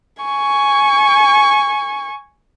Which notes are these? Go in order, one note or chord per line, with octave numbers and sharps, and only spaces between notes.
G#5 C#6